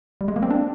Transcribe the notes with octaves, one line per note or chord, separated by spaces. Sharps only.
G3
G#3
A#3
C4
D4